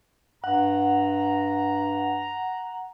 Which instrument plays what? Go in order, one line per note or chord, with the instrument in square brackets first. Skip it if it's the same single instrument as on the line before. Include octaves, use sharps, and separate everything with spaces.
[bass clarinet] G2 [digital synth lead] F#5 [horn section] A#5